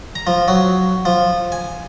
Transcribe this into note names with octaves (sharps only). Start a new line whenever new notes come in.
A#5
F3
F#3
F3
G#5